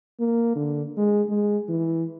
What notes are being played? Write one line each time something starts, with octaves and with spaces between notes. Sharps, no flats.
A#3
D3
G#3
G#3
E3